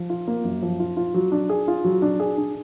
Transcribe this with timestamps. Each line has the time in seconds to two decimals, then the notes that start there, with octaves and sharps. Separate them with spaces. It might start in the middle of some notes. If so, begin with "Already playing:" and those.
Already playing: F3
0.10 F4
0.28 A#3
0.44 F#2
0.63 F3
0.80 F4
0.97 F4
1.15 F#3
1.32 D4
1.49 G#4
1.68 F4
1.85 F#3
2.02 D4
2.20 G#4
2.38 D4